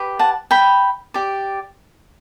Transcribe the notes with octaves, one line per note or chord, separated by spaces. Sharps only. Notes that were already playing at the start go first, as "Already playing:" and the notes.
Already playing: G4 B4
F#5 A5
G5 B5
G4 D5